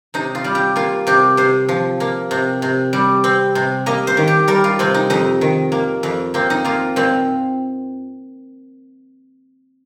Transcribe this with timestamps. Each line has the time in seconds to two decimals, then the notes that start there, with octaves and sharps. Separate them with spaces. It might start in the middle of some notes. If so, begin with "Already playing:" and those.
0.14 C3 D#4
0.35 F4
0.44 G3
0.55 G4
0.76 A#3 F4
1.07 C3 G4
1.37 C3 C5
1.69 F3
2.00 A#3
2.31 C3
2.62 C3
2.93 G3
3.24 C4
3.55 C3
3.86 A#3 D#5
4.07 C5
4.17 D#3
4.27 G4
4.48 G3 A#4
4.64 F4
4.79 C3 C4
4.94 D#4
5.10 F2 D#4
5.41 D#3
5.72 A#3
6.03 F2
6.34 A#3 C4
6.50 D#4
6.65 A#3 F4
6.96 A#2 C4